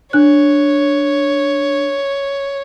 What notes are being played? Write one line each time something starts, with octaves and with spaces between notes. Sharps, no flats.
D4 C#5 F#6